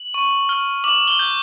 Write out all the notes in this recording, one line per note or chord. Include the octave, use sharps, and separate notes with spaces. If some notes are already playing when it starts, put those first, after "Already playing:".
Already playing: F#7
C#6
F6
D6 F#7
G7
G6